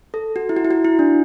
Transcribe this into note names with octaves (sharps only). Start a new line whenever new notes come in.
A4
F#4
E4
F#4
E4
F#4
E4
D4